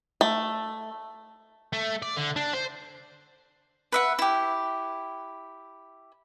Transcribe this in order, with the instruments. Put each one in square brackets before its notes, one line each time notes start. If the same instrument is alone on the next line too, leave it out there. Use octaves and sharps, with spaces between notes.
[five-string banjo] A3
[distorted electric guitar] A3
D5
D3
D4
C5
[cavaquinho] B4 E5 F#5
E4 G4